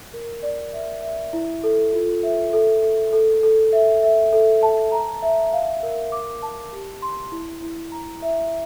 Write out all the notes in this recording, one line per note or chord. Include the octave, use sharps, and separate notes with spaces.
A#4
D5
E5
E5
E4
A4
F4
E5
A4
A4
A4
A4
E5
E5
A4
A5
A#5
E5
F5
A#4
D6
A5
G4
C6
E4
E4
A#5
E5